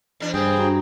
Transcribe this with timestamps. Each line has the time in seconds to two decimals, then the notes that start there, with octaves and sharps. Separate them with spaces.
0.20 E2 D4
0.34 G2 C#3 C4 G#4 G5
0.59 D4 F#4 A#5